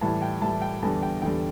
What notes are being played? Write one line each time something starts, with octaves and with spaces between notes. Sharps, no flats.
A2 E3 G3 A5
G5
A2 E3 G3 A5
G5
E2 D3 G3 A5
G5
E2 D3 G3 G5